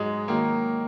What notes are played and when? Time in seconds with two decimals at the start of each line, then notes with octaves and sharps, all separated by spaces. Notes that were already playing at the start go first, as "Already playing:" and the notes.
Already playing: G#2 F#3 G#3
0.28 D#3 F#3 A#3